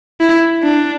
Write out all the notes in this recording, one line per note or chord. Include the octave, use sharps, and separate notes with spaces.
E4
D4